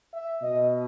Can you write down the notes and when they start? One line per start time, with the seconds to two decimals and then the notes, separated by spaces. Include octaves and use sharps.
0.13 E5
0.42 B2 D#5